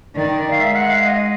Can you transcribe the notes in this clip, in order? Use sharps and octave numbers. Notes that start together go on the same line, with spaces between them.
D#3 D5
F5
G#3 E5
F#5
F5
D#5